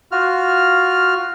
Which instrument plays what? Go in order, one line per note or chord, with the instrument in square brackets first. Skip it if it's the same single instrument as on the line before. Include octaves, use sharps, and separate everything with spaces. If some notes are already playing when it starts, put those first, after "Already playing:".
[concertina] F4 F#4 F6